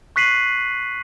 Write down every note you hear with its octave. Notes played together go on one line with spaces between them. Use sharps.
C#6 F#6 B6 C7 D#7 F#7